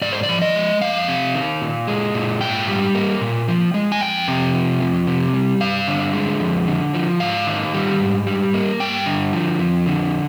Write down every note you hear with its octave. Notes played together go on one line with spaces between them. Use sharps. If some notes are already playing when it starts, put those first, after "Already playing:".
G#2 D5
C5
D5
F3
D#5
G#3
F2 F5
C3
D#3
A#2
G#3
A#2
G#2 G5
G3
A#3
A#2
F3
G#3
G#5
F2 G5
C3
F3
F2
C3
G3
G2 F5
D3
G#3
F2
D3
F3
G#2 F5
D#3
G3
G#2
G3
A#3
G2 G5
D3
F3
F2
D3